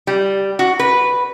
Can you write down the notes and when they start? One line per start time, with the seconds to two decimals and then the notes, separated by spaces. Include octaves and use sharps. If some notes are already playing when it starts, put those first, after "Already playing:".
0.07 G3
0.59 F#4
0.79 B4